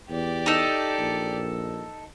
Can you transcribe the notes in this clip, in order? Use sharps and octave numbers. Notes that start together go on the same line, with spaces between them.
E2 G4 D5
D#4 A4
A#1